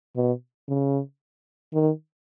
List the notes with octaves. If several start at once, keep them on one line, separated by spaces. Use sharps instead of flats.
B2
C#3
D#3